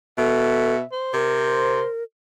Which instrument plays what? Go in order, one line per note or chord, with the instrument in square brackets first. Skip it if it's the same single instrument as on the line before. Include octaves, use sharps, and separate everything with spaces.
[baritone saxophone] B2 [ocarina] A4 [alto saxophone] E5
[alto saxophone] C5
[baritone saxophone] C3 [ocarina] A#4